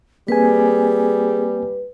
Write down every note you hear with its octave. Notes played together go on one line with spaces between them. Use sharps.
G3 A#3 C4 G#4 B4 G#5